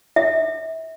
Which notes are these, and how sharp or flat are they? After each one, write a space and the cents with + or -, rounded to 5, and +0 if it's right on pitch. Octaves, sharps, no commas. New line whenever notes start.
E5 -30